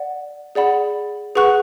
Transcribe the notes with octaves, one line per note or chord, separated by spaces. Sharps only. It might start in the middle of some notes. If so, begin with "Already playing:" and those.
Already playing: D5 F#5
G#4 D5 F#5 B5
G#4 B4 F#5 C#6 F#6